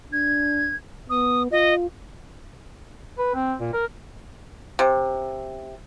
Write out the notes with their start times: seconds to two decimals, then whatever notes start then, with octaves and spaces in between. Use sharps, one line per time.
0.13 D4 G#6
1.10 B3 D#6
1.51 F4 D#5
3.19 B4
3.35 C4
3.60 A#2
3.73 A#4
4.79 C3